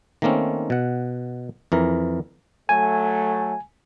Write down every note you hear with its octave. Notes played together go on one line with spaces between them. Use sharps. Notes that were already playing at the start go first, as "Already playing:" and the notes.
D#3 A3 A#3 C4 C#4
B2 F#5
F2 E3 A#4
F#3 A3 G#5